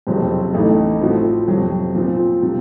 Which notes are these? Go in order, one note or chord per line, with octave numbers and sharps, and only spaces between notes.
F#1 F2 C3 F#3 C4
A1 A2 A3 D#4
A2 F3 C4 F#4
F2 C3 F#3
A#2 F3 C4
C3 F3